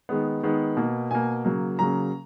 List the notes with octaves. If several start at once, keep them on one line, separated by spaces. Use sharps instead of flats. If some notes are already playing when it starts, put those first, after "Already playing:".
D#3 G#3 B3
D#3 G#3 B3
B2 A#3
B2 A#3 G#5
C#3 F#3 A#3
C#3 F#3 A#3 A#5